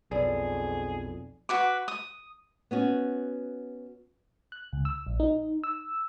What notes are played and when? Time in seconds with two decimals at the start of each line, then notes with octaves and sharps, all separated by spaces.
0.12 B1 F2 G#4 D5
1.49 F#4 B4 D6
1.88 D#6
2.71 B3 C#4 F#4
4.52 F#6
4.73 C#2
4.85 E6
5.07 A#1
5.20 D#4
5.64 E6